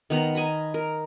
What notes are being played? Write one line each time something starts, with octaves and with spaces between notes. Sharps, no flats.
D#3 B3 A#5
D#5 G#5 A#5 B5
A#4